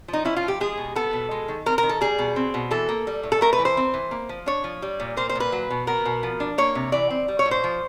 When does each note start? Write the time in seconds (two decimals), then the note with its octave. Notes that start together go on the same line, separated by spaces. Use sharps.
0.08 F3
0.13 D#4
0.25 C#4 E4
0.36 F4
0.43 F3 G4
0.60 G#3 G#4
0.78 B2
0.96 B3 A4
1.13 B2
1.31 G#3
1.48 D#3
1.66 C4 A#4
1.78 D#3 A#4
1.89 A4
2.01 G3 G#4
2.18 B2
2.36 C4
2.54 B2
2.71 E3 A4
2.89 A#3
3.07 G3
3.23 A2
3.32 A4
3.41 A3 A#4
3.53 B4
3.59 E3
3.65 C5
3.77 C4
3.94 E3
4.11 A#3
4.29 F3
4.46 D4 C#5
4.64 F3
4.82 G3
5.00 A#2
5.17 A#3 C5
5.29 C5
5.35 A#2 B4
5.52 F#3
5.70 B2
5.87 B3 A#4
6.05 B2
6.23 F3
6.40 D4
6.58 A#3 C#5
6.75 C3
6.92 E3 D5
7.10 C4
7.28 G3
7.39 C#5
7.46 A2
7.51 C5
7.64 F3